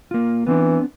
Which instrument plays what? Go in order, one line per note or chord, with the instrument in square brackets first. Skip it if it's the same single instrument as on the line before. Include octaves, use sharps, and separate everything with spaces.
[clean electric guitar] A#3 F4
[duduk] E3 [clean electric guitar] B3 C4 D4